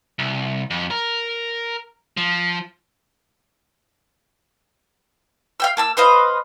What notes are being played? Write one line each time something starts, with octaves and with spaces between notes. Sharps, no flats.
C2
F2
A#4
F3
F5 G5 E6
A#3 A5 E6
B4 C5 D#5 F5